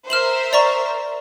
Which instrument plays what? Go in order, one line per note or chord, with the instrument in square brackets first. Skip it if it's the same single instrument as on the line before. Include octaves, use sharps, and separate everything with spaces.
[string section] A#4 C5 E5 [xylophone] F6 E7 F#7
[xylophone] D5 A#5 C#6